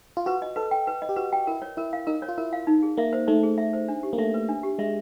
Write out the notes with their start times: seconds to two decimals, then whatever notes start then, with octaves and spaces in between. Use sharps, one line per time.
0.17 F4
0.26 F#4 B4
0.42 D#5
0.56 A4 B4
0.71 G5
0.87 B4
1.02 D#5
1.09 G4
1.16 F#4 B4
1.33 G5
1.47 E4 A#4
1.62 C#5
1.77 E4 A#4
1.93 F5
2.07 D#4 A#4
2.22 C#5
2.28 F4
2.37 E4 A#4
2.53 F5
2.67 D#4
2.83 G#4
2.97 A#3 E5
3.13 C5
3.28 A3 D#4
3.43 G#4
3.58 E5
3.73 C5
3.88 D4
4.03 G4
4.13 A#3
4.18 A3 E5
4.34 B4
4.49 D4
4.63 G4
4.79 G#3 E5